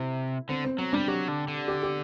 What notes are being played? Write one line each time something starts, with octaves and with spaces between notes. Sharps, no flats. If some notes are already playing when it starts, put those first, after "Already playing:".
Already playing: C3 E4
D3 C4
C4
F#3 C4
G3 D4
F#3 G4
D3
D3
G4
G4